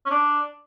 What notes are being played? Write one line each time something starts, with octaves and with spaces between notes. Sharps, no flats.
C#4
D4